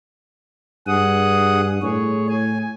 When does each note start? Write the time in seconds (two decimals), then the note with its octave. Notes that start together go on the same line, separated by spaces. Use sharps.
0.87 G2 G#4 F#5 D#6
1.83 A2 G#4 C#5
2.29 G#5